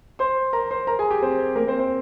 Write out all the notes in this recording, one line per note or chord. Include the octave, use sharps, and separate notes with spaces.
C5 C6
A#4 A#5
C5 C6
A#4 A#5
G#4 G#5
G4 G5
C4 C5
A#3 A#4
C4 C5
C4 C5